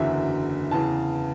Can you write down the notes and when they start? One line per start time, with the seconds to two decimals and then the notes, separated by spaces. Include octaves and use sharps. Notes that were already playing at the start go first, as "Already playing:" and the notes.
Already playing: F#1 E2 D3 F#3 E5
0.71 E2 C#3 E3 A5